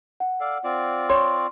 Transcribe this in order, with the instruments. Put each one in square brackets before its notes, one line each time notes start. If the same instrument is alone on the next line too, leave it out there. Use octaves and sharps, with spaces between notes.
[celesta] F#5
[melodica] A4 D5 F5
C4 F4 D5
[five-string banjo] C#5 [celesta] C6 C#6